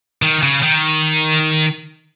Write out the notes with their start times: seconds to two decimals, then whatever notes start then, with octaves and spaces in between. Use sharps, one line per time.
0.22 D#3
0.43 C#3
0.63 D#3